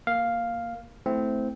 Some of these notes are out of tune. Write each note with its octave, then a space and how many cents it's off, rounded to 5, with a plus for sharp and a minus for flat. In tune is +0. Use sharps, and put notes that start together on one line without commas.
A#3 +0 F5 +0
A3 +0 C4 -10 E4 -5